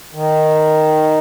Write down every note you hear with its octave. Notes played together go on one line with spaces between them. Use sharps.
D#3